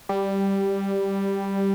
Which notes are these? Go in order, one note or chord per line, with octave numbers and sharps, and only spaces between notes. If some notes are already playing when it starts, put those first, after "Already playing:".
G3